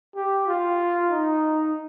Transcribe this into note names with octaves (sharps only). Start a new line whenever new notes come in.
G4
F4
D#4